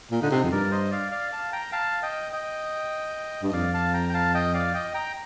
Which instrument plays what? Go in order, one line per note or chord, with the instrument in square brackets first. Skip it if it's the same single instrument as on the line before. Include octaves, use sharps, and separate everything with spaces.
[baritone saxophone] A#2
[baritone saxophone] D3 [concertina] D#4
[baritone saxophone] C3
F2
[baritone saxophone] G2 [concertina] A#4 D5
[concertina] C5 D#5
D5 F5
D5 F5
F5 A5
G5 A#5
F5 A5
D#5 G5
D#5 G5
[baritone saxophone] G2
[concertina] D#5
[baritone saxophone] F2 [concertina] D5 F5
[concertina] F5 A5
G5 A#5
G5
F5 A5
D#5 G5
D5 F5
D#5 G5
G5 A#5